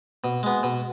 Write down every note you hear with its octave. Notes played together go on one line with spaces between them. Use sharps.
B2
G#3 B3
B2